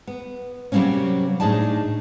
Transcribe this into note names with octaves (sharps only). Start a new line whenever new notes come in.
B3
C3 F#3 G3 A#3 C4 C#4
A2 D4 D#4 G#4 D5 A5